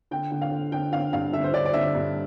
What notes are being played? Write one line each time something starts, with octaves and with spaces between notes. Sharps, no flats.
D3 G5
D3
F5
D3
D3 G5
D3 F5
G2 F5
D3 E5
C5
D3 D5
D5
D3 E5
G2